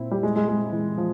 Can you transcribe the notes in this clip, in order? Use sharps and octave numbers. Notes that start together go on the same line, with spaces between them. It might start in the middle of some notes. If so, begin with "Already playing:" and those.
Already playing: A#2 C4 E4
G3
G#3
G#3
G#3
E3
F3